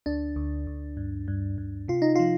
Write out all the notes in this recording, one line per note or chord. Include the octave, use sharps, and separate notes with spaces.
D2 D4
D2
D2
G2
G2
G2
C3 F4
D#4
F3 F4